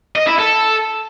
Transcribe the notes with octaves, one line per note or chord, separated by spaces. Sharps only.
D#5
E4
A4